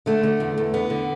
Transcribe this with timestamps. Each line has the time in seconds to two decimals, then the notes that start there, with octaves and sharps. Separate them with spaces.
0.06 D3 A3
0.23 D3
0.40 E2
0.58 E2
0.74 D3 B3
0.90 D3